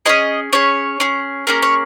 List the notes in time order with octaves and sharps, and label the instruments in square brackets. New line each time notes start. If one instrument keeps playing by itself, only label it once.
[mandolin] C#4 F4 G#4 D#5
C#4 G#4 C#5
C#4 G#4
A#3 C#4 G#4 A#4
C#5